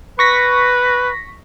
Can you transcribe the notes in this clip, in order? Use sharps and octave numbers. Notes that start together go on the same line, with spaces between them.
B4 C#6 A#6 B6